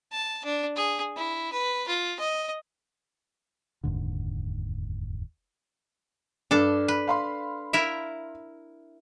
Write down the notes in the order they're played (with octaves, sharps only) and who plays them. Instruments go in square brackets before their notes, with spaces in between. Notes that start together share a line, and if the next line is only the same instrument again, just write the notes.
[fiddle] A5
D4
G#4
E4
B4
F4
D#5
[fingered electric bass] F1 D#2 G#2 D3
[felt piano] G2 [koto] D4 A4
[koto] B4
[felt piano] F5 B5 C6
[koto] E4 A#4 E5